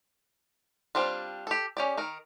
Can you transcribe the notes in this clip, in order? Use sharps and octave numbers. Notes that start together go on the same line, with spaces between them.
G3 C4 D4 F4
G4 A4
C#4 G4 D5
D#3 A#4